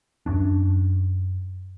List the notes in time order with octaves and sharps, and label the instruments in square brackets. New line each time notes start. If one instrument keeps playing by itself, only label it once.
[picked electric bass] F#2 C#4 D4